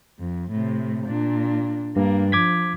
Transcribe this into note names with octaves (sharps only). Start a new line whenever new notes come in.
F2
A2 C3
A#2 D4
G2 A#3 D4
F3 D6 G#6 B6